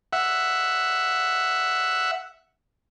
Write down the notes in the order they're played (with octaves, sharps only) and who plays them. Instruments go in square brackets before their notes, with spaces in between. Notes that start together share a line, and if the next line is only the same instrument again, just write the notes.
[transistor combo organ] E5 F#5